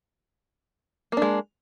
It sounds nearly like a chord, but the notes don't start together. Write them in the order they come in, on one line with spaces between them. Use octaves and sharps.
A#3 D4 G#3